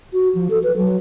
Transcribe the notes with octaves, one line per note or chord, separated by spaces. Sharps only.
F#4
F3
A4
B4
F#3